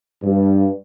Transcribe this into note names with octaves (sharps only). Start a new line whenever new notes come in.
G2